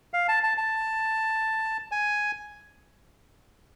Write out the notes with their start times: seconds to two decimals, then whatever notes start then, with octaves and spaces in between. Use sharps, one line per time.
0.14 F5
0.28 A5
0.43 A5
0.57 A5
1.91 G#5